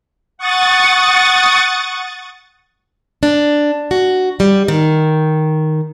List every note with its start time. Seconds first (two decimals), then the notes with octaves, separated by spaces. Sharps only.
0.38 F#5 C#6 D#6 A6
3.23 D4
3.91 F#4
4.40 G3
4.68 D#3